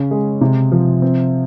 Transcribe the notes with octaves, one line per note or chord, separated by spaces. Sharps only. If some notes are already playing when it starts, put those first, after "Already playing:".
Already playing: C#3 C#4
G#3
C3
F3
C4